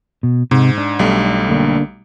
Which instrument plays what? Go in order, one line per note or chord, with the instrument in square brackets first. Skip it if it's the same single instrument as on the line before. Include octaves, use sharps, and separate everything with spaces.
[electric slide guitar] B2
[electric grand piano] G#2 [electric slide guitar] C3
[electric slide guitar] D4
[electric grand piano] B1 G3 A3
[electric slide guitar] D3 A#3 D4